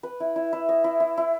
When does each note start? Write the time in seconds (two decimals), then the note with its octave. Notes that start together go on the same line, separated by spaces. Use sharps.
0.03 B4
0.20 E4
0.36 E4
0.53 E4
0.69 D#5
0.84 E4
1.00 E4
1.17 E4